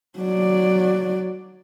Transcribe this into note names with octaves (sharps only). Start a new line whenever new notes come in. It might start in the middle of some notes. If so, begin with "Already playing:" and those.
F#3 D5